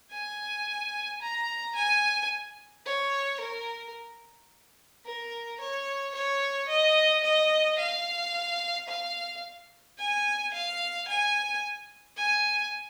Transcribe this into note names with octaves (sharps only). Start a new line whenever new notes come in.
G#5
A#5
G#5
C#5
A#4
A#4
C#5
C#5
D#5
D#5
F5
F5
G#5
F5
G#5
G#5